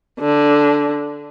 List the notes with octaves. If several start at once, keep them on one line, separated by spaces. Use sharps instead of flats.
D3